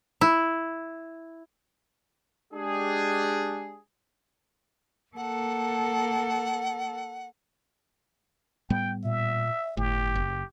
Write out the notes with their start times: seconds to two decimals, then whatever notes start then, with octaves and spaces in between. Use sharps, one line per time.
0.21 E4
2.54 G#3 D4 G4 G#4
5.16 A#3 A4 F#5
8.70 A2 G3 B3 G5
9.04 A#2 E5
9.77 G1 A2 G4
10.15 F#1